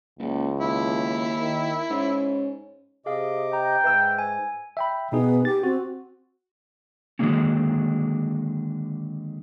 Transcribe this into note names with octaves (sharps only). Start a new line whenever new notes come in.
F#1 C#2
D#2 E4
D#3
G#2 C#4
C3 G#4 D#5 F5 D6
G5 A#5
G#2 B4 E5 E6
G#5
E5 G5 B5
B2 B3 D#4 G#4
G4 A6
C4 F#4
D3 D#3 F#3 G#3 A#3 C#4